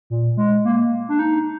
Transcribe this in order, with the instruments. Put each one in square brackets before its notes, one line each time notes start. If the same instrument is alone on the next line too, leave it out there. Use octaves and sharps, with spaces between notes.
[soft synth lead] A#2
G#3
A#3
D4
D#4